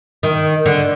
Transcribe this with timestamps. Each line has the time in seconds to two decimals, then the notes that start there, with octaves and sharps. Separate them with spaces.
0.23 D#3
0.66 D3